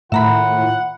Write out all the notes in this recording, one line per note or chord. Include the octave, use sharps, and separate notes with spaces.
A2 D#3 E4 F4 E5 F#5 A#5 B5